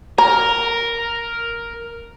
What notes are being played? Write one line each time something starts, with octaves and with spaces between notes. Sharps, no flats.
A#4 A#5